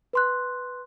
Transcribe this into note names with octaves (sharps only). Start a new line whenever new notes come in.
B4 C6 F#6